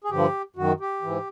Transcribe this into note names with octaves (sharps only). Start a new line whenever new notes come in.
G#4
G2 D3 F3 G4
F#2 D#3 F#4
G4
G#2 E3